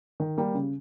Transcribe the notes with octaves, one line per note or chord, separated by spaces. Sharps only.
D#3
G3 A#3
C#3